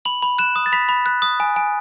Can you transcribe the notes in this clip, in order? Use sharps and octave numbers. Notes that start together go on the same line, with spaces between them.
B5 F#7
B5
F#6 E7
D#6
A6
B5 B6
B5
F#6
D#6
G#5
G#5